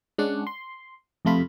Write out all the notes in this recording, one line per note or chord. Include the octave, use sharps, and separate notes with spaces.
G#3 C#4 D4 F#5
C6
F2 C3 A3 F4 B5